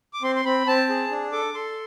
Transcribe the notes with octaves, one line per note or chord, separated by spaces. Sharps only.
D6
C4 C6
C6
C4 B5
C4 A5
G#4
D4
A4 D6
A4 C6